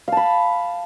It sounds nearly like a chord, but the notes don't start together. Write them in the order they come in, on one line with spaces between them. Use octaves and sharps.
F5 A5 B5